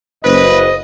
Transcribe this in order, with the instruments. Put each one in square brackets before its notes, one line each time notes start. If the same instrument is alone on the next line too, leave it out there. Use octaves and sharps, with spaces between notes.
[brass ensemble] F#1 [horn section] B4 [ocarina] C5 [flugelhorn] D#5